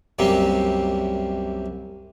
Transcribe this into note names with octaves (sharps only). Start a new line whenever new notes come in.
C2 F#2 C3 G3 A#3 C4